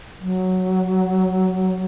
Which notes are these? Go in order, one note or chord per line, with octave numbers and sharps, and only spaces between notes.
F#3